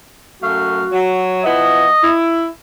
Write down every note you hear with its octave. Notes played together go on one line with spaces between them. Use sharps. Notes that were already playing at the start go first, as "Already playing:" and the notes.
F#2 A3 F#4 F5
F#3
F3 B3 E4 D#5
E4